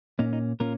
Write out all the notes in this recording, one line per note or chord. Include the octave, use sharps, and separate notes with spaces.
A#2 A#3 C#4 D#4
D#4
A#2 A#3 C#4 F4 A#4